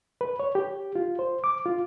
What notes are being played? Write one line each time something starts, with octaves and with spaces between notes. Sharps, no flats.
B4
C#5
G4
F4
C5
D6
F4